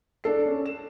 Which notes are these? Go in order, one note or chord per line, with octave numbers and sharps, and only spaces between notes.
D4 A4 C7
C#4
E7